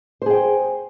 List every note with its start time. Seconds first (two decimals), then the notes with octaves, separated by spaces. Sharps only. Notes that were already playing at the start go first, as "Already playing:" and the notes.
0.22 C5
0.26 G#4
0.31 G5